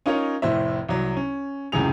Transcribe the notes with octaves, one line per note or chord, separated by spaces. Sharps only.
C#4 D#4 F4 A#4 C#5
F1 A2 C5 E5
C2 F#3
C#4
C#2 F#2 A2 C3 G#4 F7